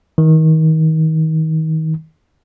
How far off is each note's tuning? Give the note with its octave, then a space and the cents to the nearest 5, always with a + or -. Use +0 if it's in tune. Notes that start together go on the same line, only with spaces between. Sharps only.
D#3 +30